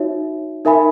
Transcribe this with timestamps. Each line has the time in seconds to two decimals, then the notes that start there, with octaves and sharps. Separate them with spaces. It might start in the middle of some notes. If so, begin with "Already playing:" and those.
Already playing: D#4 F#4 C#5 E5
0.65 D#4 A#4 E5 G#5 B5